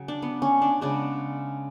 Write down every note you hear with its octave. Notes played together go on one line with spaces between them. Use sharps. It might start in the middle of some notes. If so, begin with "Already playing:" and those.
Already playing: C#3 F#3
D4
B3
C#4
D4
C#3 G#3 B3 D4